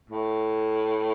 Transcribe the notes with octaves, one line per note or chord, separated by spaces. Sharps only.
A2